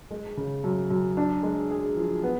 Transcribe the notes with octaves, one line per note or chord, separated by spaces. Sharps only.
G#3
C#3
F#2
F#2
D4
G#3
G#4
F3
B3